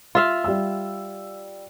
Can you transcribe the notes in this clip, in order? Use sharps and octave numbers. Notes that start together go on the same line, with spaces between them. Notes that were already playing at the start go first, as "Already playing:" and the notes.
F4 E5 F5
G3 E6